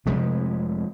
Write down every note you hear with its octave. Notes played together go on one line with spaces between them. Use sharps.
F1 F2 C3 F3 G#3